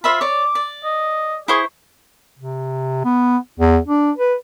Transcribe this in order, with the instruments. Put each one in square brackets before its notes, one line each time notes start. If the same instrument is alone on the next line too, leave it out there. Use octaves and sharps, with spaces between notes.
[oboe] F4 [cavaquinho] C5 E5 B5
[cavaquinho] C#5 D5 [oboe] D6
[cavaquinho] D5
[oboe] D#5
[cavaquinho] E4 C5 C#6 [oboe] G#4
[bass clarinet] C3
B3
E2
D4
B4